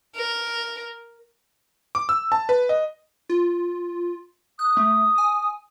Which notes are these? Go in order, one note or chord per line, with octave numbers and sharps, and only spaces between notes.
A#4
D6
E6
A5
B4
D#5
F4
D#6 F#6
A3
G#5